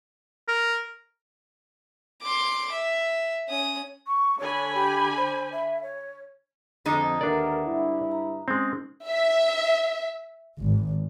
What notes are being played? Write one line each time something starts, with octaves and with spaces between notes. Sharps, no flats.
A#4
C6 D6
E5
C#4 D#6
C#6
D3 C#5 G#5 B5
G4
C5
E5
C#5
F2 D3 G#3 D#4
D#2 D4 A#4 B4 D5 E5 F#5
G2 E4
A#5
G#3 C4 C#4 D#4
E5
G#1